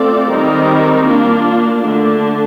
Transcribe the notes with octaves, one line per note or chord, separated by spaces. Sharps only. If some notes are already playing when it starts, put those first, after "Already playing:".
Already playing: A3 C4 F4 A4 D5
D#3 G3 C4 D#4 A#4
A#3 D4 F4
D3 A3 D4